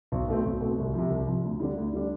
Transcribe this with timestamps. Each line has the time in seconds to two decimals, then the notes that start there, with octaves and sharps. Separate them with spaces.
0.12 B1
0.28 B2 A3 C4
0.45 B1
0.61 B2 A3 C4
0.78 C2
0.94 C3 F3
1.10 C2
1.27 C3 F3
1.44 D2
1.60 D3 G3 D4
1.77 D2
1.93 D3 G3 D4